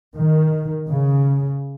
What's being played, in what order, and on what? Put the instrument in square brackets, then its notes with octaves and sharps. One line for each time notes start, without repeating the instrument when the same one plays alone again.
[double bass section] D#3
C#3